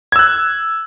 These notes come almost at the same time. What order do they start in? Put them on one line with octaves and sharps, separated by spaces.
G#6 E6 F#6